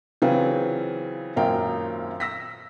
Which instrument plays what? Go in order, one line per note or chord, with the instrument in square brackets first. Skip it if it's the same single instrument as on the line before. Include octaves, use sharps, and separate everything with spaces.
[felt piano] C#3 E3 F#3 C4 F4 B4
G#1 F#2 A#2 A#4 F5 G5
E6 A#6 B6